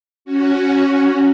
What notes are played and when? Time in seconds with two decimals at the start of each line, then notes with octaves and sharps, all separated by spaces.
0.25 C#4 F#4